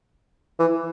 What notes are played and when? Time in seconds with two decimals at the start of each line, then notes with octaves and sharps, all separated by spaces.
0.59 E3